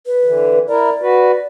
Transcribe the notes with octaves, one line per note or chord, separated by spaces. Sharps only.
B4
D3 E3
E4 A#4 D5
F#4 B4